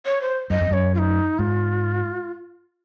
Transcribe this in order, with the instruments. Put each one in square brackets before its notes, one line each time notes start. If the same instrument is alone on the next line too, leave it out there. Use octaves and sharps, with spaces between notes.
[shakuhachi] C#5
C5
[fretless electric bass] F#2 [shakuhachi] D#5
[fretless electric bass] F2
[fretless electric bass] F#2 [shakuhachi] C#5
[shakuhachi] F4
D#4
[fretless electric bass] G#2 [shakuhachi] F4